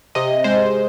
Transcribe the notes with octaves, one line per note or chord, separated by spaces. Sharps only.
C3 D#5
G#3 C5